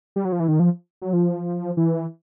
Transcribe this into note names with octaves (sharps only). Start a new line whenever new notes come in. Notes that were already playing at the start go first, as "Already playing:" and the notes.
G3
F#3
F3
E3
D#3
F3
F#3
F3
E3